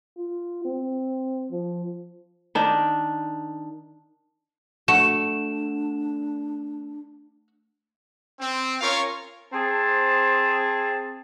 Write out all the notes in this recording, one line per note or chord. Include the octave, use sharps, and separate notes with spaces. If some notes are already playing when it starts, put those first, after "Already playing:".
F4
C4
F3
D#3 D4
A3 D4 F#4 E7
C4
C#4 F4 A#4 C#5 F5 C#6
C4 G#4 A5